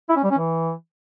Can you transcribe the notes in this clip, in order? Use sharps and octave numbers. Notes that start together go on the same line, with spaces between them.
E4
C#4
G3
C#4
E3